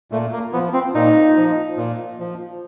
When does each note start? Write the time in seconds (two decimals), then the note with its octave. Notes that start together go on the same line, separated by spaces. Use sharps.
0.11 A#2 A3
0.33 A#3
0.53 F3 B3
0.73 C4
0.94 A#2 D#4
1.37 F3
1.77 A#2
2.20 F3